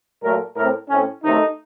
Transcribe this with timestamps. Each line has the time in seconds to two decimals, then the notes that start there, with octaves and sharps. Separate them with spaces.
0.22 A#2 F#3 A3 A#4
0.55 A2 A3 C4 A#4
0.89 A2 A3 C4 C#4
1.22 C3 D#3 F#3 A3 D#4